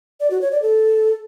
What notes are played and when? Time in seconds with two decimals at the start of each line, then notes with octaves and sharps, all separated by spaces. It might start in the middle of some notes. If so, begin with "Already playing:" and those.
0.20 D5
0.31 F#4
0.41 C#5
0.52 D5
0.62 A4